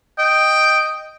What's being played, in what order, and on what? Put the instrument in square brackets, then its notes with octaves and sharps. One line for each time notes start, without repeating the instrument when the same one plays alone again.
[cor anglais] D#5 [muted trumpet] G5